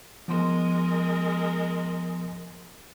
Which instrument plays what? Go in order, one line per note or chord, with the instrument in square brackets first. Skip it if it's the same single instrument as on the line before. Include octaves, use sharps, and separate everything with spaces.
[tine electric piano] F3 B3 C6 [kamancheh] G#3 A#4